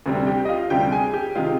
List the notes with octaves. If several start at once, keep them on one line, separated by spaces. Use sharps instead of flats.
D2 C3 G3
G4 G5
D#5
F4 F5
D2 C3 G3 G4 G5
G#4 G#5
G4 G5
C3 D#3 G#3 F4 F5